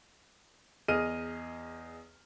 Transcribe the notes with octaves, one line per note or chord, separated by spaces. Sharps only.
E2 G#4 D#5 F6 D#7